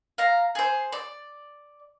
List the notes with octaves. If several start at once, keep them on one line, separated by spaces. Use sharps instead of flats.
F5 A#5
G#4 C5
D5